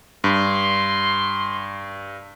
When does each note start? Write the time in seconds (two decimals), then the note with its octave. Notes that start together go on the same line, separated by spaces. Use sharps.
0.24 G2 C6